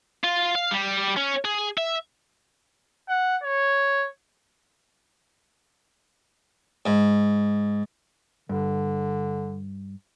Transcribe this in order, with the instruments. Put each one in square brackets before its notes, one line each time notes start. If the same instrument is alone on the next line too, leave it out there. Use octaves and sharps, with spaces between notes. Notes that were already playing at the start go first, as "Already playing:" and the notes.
[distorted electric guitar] F4
F5
G3
C#4
G#4
E5
[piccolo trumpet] F#5
C#5
[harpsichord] G#2
[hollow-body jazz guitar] G2 [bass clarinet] D3